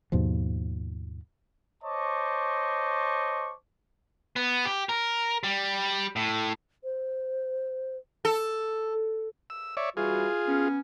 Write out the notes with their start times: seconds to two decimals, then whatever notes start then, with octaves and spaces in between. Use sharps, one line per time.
0.12 D#2 G#2 B2 F3
1.84 C5 C#5 D#5 A5 C#6 D6
4.36 B3
4.65 G4
4.89 A#4
5.43 G3
6.16 A2
6.84 C5
8.25 A4
9.50 E6
9.77 C#5 D5 E5
9.97 E3 G3 F4 F#4 G#4
10.47 B3 C#4